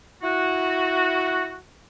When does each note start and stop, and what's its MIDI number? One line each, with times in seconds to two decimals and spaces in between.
0.23 1.56 64
0.23 1.56 66